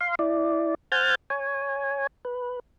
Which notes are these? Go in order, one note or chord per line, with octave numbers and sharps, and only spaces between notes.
F5 C6
E4 D5
C5 F#5 G#5 F6 G6 A6
C#5 G#5
B4